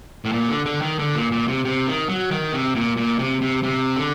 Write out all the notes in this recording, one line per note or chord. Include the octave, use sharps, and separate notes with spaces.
A2
A#2
D3
D3
D#3
D3
A#2
A#2
C3
C3
D#3
F#3
D#3
C3
A#2
A#2
C3
C3
C3
D3